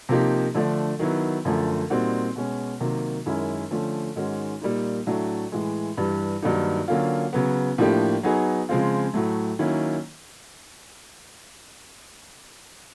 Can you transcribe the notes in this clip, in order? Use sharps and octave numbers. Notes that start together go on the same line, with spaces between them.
C3 F3 A#3 D#4 G4
D3 F3 A3 D4
D#3 F#3 B3 E4
F#2 D3 F3 A3
A#2 G3 C4 D#4 F#4
B2 G#3 C#4
C3 D#3 F#3 A#3
F#2 D#3 G#3 C#4 E4
D3 F3 A3 C#4
G#2 D#3 G#3 C#4 F#4
A#2 G3 A#3 D#4
A2 F#3 A3 D4
A2 E3 G#3
G2 E3 G3
G2 D#3 F#3 A#3 D#4
D3 F#3 A#3 C#4 F4
C#3 F#3 B3
A2 F3 A#3 D4 G4
F#3 B3 D#4 G#4
C#3 F3 G#3 C4 F4
A2 F#3 A3
D#3 F#3 A#3 C#4 E4